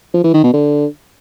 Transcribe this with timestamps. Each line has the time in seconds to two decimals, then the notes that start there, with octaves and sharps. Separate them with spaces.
0.14 F3
0.24 E3
0.34 D#3
0.43 B2
0.53 D3